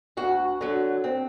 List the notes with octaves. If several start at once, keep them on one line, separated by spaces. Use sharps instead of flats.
D2 F#4
D3 F#3
C4